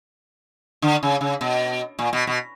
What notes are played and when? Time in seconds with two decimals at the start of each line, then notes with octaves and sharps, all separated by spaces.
0.82 D3
1.03 C#3
1.21 C#3
1.41 B2
1.99 A#2
2.13 B2
2.27 B2